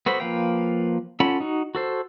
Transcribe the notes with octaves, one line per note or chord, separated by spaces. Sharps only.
B3 F#4 A4 C5 B5
F3 A#3 B4 F5 G5
C#4 F4 A4 F#5 B5
D#4 F#4
F#4 A4 C5